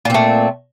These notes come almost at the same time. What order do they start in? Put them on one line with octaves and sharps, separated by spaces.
A#2 C4 A3